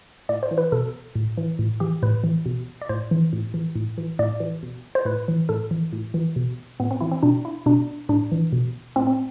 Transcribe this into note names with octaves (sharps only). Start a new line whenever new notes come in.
A2 D5
C5
E3
B4
B2 A4
A2
E3
A2
E3 G4
A2 B4
E3
B2
D5
A2 C5
E3
A2
E3
A2
E3
A2 D5
E3
B2
C5
A2 B4
E3
A2 A4
E3
A2
E3
B2
A2 B3
C4
E3 E4
C4
B2 D4
E4
B2 D4
A2 D4
E3
B2
A2 C4
C4